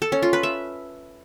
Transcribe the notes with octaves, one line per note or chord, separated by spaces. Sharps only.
A4
C#4
F4
B4
E5